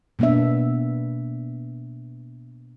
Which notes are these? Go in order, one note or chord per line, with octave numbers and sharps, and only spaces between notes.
B2 A#3 B3 D4 E5